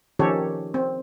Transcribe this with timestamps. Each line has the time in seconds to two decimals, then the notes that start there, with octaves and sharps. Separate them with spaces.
0.19 D#3 F3 C#4 G4 A4 C#5
0.74 C4